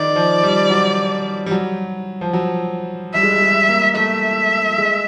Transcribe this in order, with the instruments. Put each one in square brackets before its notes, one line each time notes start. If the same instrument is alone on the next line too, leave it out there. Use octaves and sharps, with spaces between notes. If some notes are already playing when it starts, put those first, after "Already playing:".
Already playing: [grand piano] D#3 [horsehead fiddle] D5
[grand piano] F3
G3
F#3
G3
F#3
F3
F#3
[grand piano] G3 [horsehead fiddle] E5
[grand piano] G#3
G3
G#3
A#3
[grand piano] A3 [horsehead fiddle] E5
[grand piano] G#3